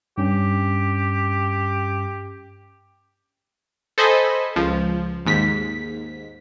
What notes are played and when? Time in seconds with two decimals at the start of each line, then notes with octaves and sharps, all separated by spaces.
0.18 G2 C#4 G4
3.98 A4 C5 D#5 G#5 B5
4.56 C#2 F3
5.26 D#2 G#2 B6